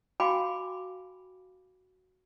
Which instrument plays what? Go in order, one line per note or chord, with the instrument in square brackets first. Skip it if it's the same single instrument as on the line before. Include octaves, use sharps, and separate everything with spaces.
[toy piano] F#4 F5 G5 G#5 B5 D6